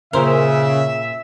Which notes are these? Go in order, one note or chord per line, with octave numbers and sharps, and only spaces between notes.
A#2 C#3 A#4 C5 E5